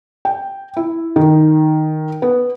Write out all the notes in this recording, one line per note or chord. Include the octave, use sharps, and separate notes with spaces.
G5
E4
D#3
B3